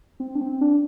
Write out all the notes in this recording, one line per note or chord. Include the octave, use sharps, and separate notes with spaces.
C4
D4
C4
D4